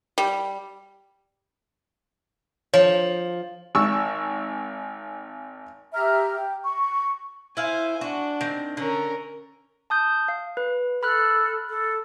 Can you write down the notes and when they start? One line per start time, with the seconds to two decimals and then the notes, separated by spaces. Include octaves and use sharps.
0.18 G3
2.74 F3 C#5
3.75 G#1 C#6 E6
5.93 G4 E5 A#5 F6
6.35 G5
6.63 C#6
7.57 E4 C5 F5 G#5
8.01 D4 F#4
8.41 D#3 C4
8.77 D3 C#4 A#4
9.90 A5 D#6 G6
10.28 F5
10.57 B4
11.03 A4 B5 F6 F#6
11.69 A4